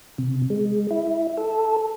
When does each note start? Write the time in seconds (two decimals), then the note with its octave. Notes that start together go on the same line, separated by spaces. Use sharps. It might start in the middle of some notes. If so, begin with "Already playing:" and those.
0.18 C3
0.50 G#3
0.91 E4
1.37 A4